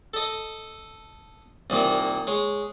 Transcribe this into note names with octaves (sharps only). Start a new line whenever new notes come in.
A4 D#5
C2 A#2 D#3 A#3
G#3 C#5